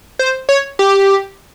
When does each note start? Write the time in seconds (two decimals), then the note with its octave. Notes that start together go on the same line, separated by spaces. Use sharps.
0.19 C5
0.49 C#5
0.79 G4